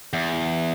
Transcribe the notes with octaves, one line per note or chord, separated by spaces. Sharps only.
E2